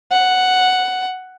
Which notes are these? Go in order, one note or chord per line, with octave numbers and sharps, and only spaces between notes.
F#5